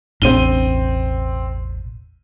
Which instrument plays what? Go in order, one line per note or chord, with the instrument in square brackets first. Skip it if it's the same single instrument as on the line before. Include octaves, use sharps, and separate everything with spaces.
[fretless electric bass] E1 A1 D4 [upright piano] C4 D#7 G7